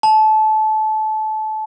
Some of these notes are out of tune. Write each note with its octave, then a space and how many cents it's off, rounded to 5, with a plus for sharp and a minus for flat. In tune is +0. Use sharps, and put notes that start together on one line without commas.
A5 -25